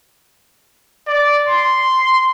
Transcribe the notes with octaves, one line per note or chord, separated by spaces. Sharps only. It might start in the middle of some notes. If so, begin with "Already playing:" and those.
D5
C6